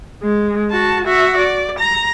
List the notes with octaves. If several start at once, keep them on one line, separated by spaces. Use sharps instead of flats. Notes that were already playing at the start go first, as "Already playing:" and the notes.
G#3
F#4 A5
F#4 E5
D5
A#5